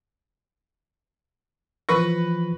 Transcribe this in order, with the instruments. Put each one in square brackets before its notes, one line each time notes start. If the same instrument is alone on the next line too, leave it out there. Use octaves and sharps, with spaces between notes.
[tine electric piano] E3 F3 A#6 [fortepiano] B4 C#6